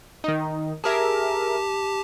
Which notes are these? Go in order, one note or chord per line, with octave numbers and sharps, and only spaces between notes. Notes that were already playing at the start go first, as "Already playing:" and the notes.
D#3 D#4
G4 G#4 A#4 E5 A5